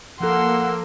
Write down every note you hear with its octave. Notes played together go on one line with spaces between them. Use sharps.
F3 A#3 A4 F#5 C6 E6